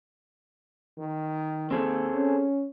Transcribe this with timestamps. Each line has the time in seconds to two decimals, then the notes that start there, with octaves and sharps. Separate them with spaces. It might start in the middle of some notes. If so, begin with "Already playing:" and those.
0.98 D#3
1.71 D#2 C4 G#4 A4
2.14 C#4